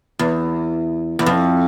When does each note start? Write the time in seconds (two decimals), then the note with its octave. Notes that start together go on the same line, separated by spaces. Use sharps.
0.19 E2
1.19 E2
1.26 F2